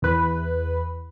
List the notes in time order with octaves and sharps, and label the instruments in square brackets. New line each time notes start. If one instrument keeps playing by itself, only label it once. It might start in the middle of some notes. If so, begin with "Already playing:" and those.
[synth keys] E2 B4